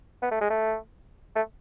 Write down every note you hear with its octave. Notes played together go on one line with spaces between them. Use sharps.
B3
A3
G#3
A3
A3